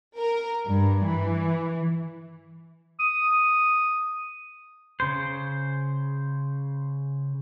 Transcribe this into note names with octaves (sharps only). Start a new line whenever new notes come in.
A#4
G2
E3
D#6
C#3 C5